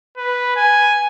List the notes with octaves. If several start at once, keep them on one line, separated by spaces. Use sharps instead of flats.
B4
G#5